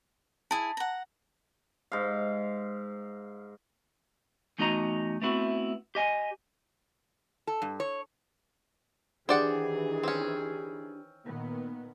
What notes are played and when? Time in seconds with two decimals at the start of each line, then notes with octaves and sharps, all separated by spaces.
0.51 E4 G#4 A5
0.77 F#5 A#5
1.92 G#2 F5
4.58 E2 A3 D#4 F#4 D#5 A#5
5.22 A3 B3 C4 E4 F#4
5.95 G4 D#5 G#5
7.47 A4
7.62 G2
7.80 C#5
9.29 D#3 E3 D4 G4 G#4 C5 D5 F#5
10.03 C4 C#4
11.26 A#2 D#3 B3